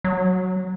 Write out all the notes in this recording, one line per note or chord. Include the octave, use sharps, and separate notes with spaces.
F#3